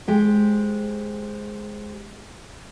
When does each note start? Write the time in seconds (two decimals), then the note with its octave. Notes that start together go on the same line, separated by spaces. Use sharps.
0.08 G#3 G4 C5